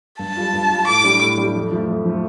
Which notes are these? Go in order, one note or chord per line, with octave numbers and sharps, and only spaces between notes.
G2 A5
G3 F4
G2
G3 F4
A2 D6
G3 D4 G4
A2
G3 D4 G4
F2
F3 A3
F2
F3 A3